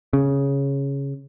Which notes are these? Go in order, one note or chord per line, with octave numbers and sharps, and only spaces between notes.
C#3